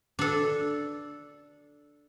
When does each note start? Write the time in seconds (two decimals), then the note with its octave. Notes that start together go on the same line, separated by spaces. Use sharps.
0.19 D4 A4